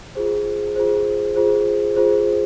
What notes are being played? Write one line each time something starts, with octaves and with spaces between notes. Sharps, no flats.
F4 G#4 C5
F4 G#4 C5
F4 G#4 C5
F4 G#4 C5